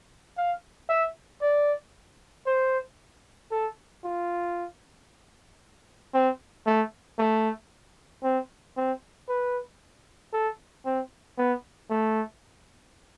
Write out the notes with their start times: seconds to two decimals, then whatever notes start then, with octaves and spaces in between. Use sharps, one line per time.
0.37 F5
0.89 E5
1.42 D5
2.47 C5
3.51 A4
4.04 F4
6.14 C4
6.66 A3
7.19 A3
8.23 C4
8.77 C4
9.29 B4
10.33 A4
10.86 C4
11.38 B3
11.90 A3